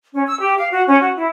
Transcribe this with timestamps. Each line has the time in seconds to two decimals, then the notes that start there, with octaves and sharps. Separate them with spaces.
0.13 C#4
0.27 E6
0.40 G4
0.58 F5
0.71 F#4
0.88 C#4
1.02 F#4
1.17 E4